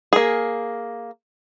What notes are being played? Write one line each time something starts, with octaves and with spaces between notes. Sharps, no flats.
A#3 G#4